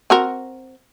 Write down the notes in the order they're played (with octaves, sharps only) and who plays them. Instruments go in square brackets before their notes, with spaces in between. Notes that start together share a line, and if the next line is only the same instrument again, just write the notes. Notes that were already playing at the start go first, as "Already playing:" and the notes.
[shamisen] C4 F#4 A#4